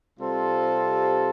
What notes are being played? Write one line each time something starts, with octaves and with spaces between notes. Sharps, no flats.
C3 G3 C4 F4 A4